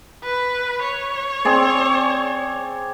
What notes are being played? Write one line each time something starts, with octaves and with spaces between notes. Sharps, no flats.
B4
C#5
C4 G#4 D5